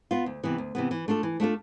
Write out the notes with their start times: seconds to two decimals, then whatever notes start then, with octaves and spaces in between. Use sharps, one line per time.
0.11 B3 F4
0.26 D2
0.43 C3 E3 B3
0.58 D2
0.75 C3 E3 B3
0.91 E3
1.08 A3 D4 F4 A4
1.23 E3
1.40 A3 D4 F4 A4